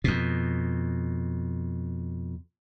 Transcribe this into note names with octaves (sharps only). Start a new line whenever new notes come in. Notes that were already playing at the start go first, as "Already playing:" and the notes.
F2 B2